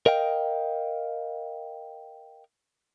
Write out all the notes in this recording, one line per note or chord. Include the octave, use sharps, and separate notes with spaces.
A#4 D#5 F5 G5